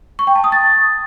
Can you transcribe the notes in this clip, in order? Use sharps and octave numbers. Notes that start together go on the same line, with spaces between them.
C#6
G5
A5
D#6
A6